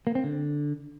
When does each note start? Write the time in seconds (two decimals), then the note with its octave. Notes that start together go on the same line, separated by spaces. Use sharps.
0.07 A#3
0.15 C4
0.24 D3